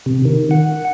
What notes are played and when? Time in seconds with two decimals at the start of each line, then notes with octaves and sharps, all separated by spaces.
0.06 C3
0.25 D#3
0.51 F#5